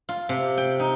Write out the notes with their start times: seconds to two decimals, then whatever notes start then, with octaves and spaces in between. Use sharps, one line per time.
0.09 F4
0.29 C3
0.57 G5
0.80 D#4